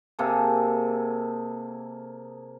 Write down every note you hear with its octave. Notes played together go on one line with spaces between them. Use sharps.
C3 A#3 G#4 A4